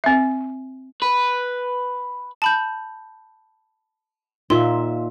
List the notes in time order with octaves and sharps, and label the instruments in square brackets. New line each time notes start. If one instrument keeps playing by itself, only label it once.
[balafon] C4 E5
[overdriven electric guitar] B4
[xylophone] A5 B5 G6
[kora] A#2 E5 [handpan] D#4 F4 [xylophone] C6